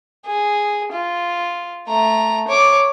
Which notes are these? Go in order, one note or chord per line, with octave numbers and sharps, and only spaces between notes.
G#4
F4
A3 A#5
C#5 D6